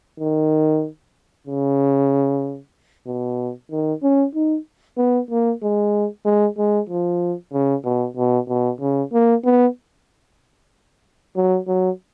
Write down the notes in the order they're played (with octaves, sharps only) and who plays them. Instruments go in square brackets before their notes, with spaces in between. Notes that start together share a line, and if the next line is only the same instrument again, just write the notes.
[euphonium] D#3
C#3
B2
D#3
C#4
D#4
B3
A#3
G#3
G#3
G#3
F3
C#3
B2
B2
B2
C#3
A#3
B3
F#3
F#3